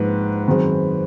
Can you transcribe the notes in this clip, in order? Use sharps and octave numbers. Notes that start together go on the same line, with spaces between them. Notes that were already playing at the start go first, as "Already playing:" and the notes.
Already playing: A#1 G#2 F3 B4
F#2 D#3 G#3 C4